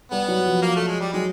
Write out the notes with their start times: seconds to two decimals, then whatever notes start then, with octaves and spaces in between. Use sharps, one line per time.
0.11 G3 B3
0.28 F#3
0.46 F3
0.62 A#3
0.76 A3
0.87 G#3
1.01 G3
1.13 F#3 G#3